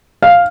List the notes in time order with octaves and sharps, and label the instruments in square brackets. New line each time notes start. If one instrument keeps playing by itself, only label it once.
[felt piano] F5